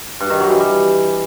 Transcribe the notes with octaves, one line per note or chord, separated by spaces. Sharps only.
G2
D#3
F#3
E3
G3